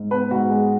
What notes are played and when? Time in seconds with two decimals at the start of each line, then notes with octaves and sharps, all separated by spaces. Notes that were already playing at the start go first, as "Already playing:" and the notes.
Already playing: G#2
0.11 B3 B4
0.31 G#2 F#4
0.50 G#3